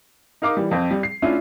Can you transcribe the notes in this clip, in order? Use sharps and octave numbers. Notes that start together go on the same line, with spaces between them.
D#4 A#4 F5 D6
E3 G3
F2 C4
G3
C7
A3 C#4 D4 E4 F4